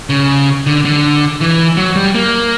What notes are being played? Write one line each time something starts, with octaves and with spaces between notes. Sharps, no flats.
C#3
D3
D3
E3
F#3
G3
A#3